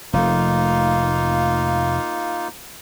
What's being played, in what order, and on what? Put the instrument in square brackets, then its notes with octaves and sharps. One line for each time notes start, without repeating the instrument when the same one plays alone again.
[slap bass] F1 A3 [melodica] A#3 D#4 F4